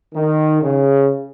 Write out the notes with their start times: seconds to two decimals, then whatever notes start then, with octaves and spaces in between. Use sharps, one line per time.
0.13 D#3
0.62 C#3